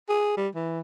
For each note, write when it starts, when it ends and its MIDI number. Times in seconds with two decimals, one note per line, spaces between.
0.09 0.37 68
0.37 0.48 55
0.55 0.80 52